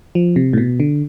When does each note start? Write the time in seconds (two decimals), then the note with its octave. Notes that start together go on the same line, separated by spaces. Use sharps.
0.15 F3
0.36 C3
0.53 A2
0.58 B2
0.80 D3